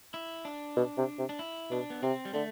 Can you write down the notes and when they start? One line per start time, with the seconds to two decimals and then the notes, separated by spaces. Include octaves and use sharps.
0.14 E4
0.45 D4
0.77 B2
0.98 C3
1.18 C3
1.29 D4
1.39 E4
1.71 B2 D4
1.90 B3
2.03 C3 C4
2.25 G3
2.34 D3 A3